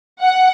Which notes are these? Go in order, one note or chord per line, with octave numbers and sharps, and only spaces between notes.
F#5